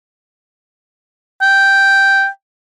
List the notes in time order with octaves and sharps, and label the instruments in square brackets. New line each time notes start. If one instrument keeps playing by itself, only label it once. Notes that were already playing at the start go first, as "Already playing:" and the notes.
[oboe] G5